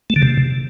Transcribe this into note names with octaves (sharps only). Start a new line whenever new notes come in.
A3
D3
C3